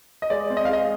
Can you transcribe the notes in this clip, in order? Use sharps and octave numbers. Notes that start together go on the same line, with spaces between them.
D#5
G#3 D5
C4
D#5
F5
G#3 D#5